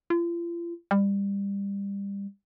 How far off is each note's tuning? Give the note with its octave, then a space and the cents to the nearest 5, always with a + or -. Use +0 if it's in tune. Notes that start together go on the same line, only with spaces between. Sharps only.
F4 -40
G3 +25